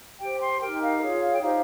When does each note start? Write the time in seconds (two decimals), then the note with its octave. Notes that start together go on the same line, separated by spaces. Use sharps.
0.20 G4 C5 G5
0.40 C6
0.60 D#4 G4 A#4 G5
0.81 F5
1.01 F4 G#4 C#5
1.33 G5
1.41 D#4 G4 C5 F5